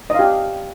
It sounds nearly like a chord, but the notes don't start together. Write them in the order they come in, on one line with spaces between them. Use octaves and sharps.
D#5 F5 G4